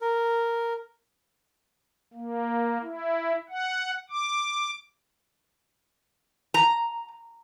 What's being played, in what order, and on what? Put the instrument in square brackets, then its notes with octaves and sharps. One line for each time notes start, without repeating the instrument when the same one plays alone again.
[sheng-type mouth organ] A#4
[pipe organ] A#3
E4
F#5
D6
[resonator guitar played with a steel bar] A#5